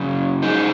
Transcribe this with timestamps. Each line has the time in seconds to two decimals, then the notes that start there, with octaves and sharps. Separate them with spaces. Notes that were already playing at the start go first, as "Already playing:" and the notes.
Already playing: F#2 C#3
0.43 D#4 G#4